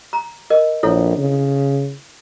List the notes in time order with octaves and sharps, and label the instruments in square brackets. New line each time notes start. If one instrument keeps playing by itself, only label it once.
[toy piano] A#5
A#4 D#5
[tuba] A#1 [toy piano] E4 A4 C#5
[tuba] C#3